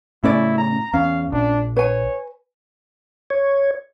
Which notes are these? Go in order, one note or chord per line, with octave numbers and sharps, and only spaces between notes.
A2 C#3 C#4 E4 C#5 D5
A#5
E2 C#4 F5
A#1 D4
B4 C#5 G#5
C#5